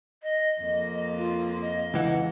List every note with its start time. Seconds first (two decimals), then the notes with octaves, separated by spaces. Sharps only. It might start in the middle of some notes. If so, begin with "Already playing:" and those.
0.23 D#5
0.62 F2 A#3
1.18 F4
1.61 D#5
1.94 C#2 E3 F#5